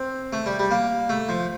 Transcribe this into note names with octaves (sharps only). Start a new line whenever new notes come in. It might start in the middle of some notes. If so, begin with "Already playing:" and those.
Already playing: C4
A3
G3
G3
A#3
A3
F3